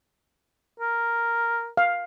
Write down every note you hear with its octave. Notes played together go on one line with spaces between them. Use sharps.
A#4
F5